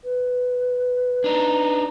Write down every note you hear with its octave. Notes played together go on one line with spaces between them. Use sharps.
B4
D4 D#4